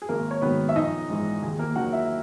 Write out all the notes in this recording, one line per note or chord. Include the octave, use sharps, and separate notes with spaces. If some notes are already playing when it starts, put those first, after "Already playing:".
G#4
G#1 A#3 A#4
C#5
G#2 D#3 F#3 B3 B4
E5
A#1 D#4 D#5
G#2 E3
D#2 G#4
A#3 A#4
D#3 F#3 F#4 F#5
E4 E5